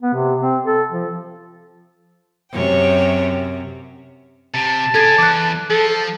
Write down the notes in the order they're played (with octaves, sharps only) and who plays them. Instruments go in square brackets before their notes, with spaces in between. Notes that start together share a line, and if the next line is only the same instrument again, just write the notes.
[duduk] B3
C3
C4
A4
F3
[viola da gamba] F#2 C3 [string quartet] C#5 G5
[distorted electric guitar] C3 [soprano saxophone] A5
[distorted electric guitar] C#4 G#4 [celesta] A4 G#6
[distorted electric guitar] E2 [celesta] D6 F#6
[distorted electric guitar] F3 [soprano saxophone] A4